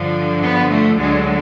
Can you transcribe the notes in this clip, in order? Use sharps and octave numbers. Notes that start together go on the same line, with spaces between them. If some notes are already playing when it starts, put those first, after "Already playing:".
Already playing: G2 D3 F3
B3
A3
D2 D3 F#3 G#3